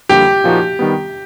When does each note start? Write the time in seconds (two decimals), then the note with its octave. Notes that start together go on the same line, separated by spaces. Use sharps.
0.09 F2 D3 G3 A#3 G4
0.44 A#2 F3 A#3 D#4 F#4
0.79 D#3 G3 B3